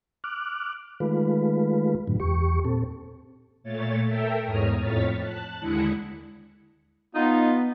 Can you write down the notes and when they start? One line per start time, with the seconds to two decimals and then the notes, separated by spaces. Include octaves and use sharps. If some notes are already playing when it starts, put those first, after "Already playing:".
0.24 D6 F6 F#6
1.00 D#3 G#3 A3 F4 B4
2.07 F#2 A2 D3 F#3
2.20 E2 G4 C#6
2.65 A#2 C4 A4
3.63 A#2 A3 C#5 A6
4.05 A4 A#4 E5 G5
4.45 E2 G#2 C#5 A#5 D#6 F6
4.80 F2 A2 C#5 F6 A6 B6
5.20 A5 F#6
5.60 D#2 D3 G#3 E4 D#6 C#7
7.15 B3 D#4 F4